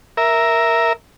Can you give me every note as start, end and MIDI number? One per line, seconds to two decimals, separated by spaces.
0.17 0.93 70
0.17 0.93 76